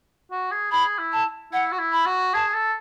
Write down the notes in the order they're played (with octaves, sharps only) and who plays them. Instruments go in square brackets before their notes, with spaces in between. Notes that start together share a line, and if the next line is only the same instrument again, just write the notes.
[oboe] F#4
G#4
[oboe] G#4 [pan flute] B5
[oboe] E4
[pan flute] A5
[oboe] E4 [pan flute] F#5
[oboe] F#4
E4
[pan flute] B5
[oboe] F#4
[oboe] G#4 [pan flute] A5
[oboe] A4